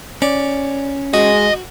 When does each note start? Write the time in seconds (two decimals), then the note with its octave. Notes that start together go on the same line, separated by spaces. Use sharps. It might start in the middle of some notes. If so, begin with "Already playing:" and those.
0.22 C#4 D5
1.14 G#3 F#4 D#5